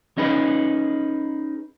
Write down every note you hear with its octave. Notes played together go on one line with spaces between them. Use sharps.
C#4 D#4 G#4 B4